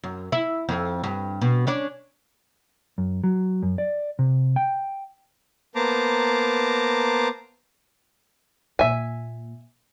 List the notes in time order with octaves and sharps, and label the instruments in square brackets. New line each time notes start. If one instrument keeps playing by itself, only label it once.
[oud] F#2
E4
F2
G2
B2
C#4 D4 D5
[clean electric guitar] F#2
F#3
F#2
D5
C3
G5
[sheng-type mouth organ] A#3 B3 C5 A5 A#5 D6
[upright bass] A#2 A#3 [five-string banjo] E5 G#5